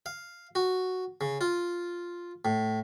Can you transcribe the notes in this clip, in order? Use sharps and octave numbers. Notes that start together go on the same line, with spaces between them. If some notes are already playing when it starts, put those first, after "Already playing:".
F5
F#4
C#3
F4
A2